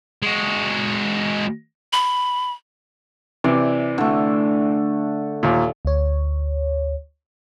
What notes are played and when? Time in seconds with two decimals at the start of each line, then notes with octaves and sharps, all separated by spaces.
0.22 G#3 F#4
1.93 B5
3.44 C3 E3 D5
3.98 D3 A3
5.43 D#2 A#2
5.85 D2 C#5